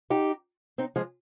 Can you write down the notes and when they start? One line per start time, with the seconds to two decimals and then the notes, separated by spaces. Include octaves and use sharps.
0.10 D#4 G4
0.78 C4 D#4
0.96 F3 G#3